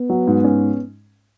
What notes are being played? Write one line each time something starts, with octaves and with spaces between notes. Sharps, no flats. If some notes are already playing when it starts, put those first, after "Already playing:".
Already playing: B3
F#3
G#2
C#4